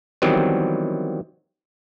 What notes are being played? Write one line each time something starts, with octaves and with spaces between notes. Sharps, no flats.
D#3 E3 F#3 G3 B3 C4